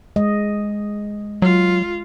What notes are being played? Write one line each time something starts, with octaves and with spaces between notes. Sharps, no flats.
G#3 D#5
F#3 F4